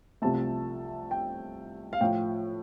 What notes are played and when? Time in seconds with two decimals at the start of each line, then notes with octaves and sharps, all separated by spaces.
0.22 C2 C3 F3 A3 A5
1.11 G5
1.93 F5
2.01 A2 F3 A3 G5